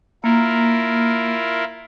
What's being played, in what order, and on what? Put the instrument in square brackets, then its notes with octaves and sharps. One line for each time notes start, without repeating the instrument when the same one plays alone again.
[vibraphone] A#3 [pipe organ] E4 F4 A#4